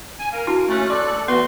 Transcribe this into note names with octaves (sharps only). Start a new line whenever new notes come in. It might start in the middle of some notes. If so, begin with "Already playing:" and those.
G#5
A#4 F5
D4 E4 F#4
D#2 A3 C#4 F#6
A4 D5 C6 F#6
E3 A3 B3 F#4 B4 C6